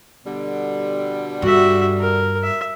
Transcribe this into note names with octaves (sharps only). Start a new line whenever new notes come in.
B2 D3 G3
G2 F#4 E5
A#4
E5